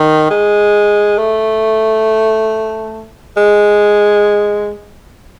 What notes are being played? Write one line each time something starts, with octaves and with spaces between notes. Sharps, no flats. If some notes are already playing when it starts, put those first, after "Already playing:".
Already playing: D#3
G#3
A3
G#3